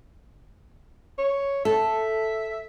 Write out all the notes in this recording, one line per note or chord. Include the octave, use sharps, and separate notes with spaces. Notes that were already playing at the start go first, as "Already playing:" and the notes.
C#5
A4 E5